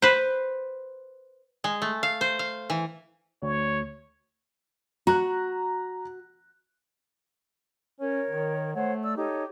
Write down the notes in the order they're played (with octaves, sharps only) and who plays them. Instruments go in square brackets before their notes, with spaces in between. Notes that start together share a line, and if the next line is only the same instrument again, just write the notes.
[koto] B4 C5
G#3
A3
F5
C5
F5
E3
[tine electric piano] D2 [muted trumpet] C#5
[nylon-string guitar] F#4 [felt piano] A#5 F#6
[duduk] C#4 [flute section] A#4 C#5
[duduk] D#3
[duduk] A3 [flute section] C5 C#5 F#5
[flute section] D5 E6
[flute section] D#4 A4 C#5 [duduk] G4